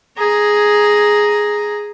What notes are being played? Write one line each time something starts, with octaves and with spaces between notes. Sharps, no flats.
G#4 A#5